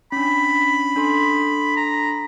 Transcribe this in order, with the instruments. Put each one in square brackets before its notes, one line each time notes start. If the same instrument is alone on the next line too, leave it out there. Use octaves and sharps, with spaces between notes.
[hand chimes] C#4 D4 [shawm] B5
[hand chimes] D4 A4 C6
[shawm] A#5